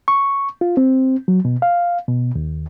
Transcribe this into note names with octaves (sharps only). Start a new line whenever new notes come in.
C#6
F4
C4
F#3
B2
F5
B2
D#2